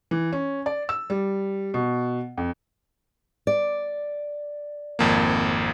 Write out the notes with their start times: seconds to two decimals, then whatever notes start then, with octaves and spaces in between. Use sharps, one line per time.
0.11 E3
0.33 C#4
0.66 D5
0.89 E6
1.10 G3
1.74 B2
2.37 F2
3.47 D5
4.99 G#1 F2 A#3